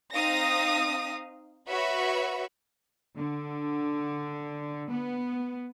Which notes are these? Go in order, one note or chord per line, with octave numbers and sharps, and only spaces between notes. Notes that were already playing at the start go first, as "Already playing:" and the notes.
C4 D#4 F5 D#6 A#6
F#4 B4 C#5 E5 B5 C#6
D3
B3